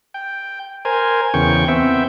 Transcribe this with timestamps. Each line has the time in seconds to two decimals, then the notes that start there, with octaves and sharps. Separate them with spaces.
0.14 G5
0.85 A#4 C5 G#5
1.34 E2 C#3 G5 C#6
1.68 B3 C4 E5 G5